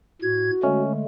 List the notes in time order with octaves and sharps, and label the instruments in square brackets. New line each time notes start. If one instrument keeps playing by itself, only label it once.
[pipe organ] A2 G#6 [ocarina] F#4
[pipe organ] D3 G#3 A3 [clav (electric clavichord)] C#4